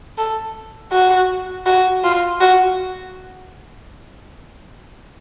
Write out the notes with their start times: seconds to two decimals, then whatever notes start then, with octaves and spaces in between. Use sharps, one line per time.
0.18 A4
0.92 F#4
1.66 F#4
2.04 F4
2.40 F#4